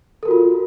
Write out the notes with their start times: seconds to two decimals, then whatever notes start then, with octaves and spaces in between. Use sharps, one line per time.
0.23 A4
0.25 A#4
0.28 F#4
0.31 F4